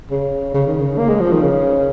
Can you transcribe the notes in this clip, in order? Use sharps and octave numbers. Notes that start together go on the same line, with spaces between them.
C#3
C#3
D#3
C#3
A#3
G#3
F3
D#3
C#3